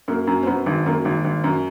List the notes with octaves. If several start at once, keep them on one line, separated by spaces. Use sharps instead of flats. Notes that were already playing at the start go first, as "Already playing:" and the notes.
F#2 A#3
F#2
C4
F#2 B3
G#1
F#2 A#3
G#1
G#1
F#2